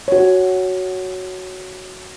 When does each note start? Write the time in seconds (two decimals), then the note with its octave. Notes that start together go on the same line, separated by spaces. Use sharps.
0.08 F#4 C#5